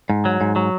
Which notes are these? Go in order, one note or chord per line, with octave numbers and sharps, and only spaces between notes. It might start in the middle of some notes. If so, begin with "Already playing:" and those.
G#2
F#3
G#2
F#3